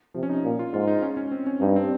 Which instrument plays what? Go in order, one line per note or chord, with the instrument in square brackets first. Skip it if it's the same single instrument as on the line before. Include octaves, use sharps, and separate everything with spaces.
[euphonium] C3 [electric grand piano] F3
[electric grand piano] C#4
D#4
[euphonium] A#2
[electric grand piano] F4
[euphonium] G#2 [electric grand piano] F4
[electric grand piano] D#4
C#4
C#4
C4
C#4
[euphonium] G2 [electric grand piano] D#4
[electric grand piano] C4